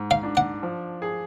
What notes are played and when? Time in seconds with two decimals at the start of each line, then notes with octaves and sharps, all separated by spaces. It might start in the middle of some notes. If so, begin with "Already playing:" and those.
Already playing: G#2
0.11 F5
0.23 D4
0.37 F#5
0.63 F3
1.02 G#4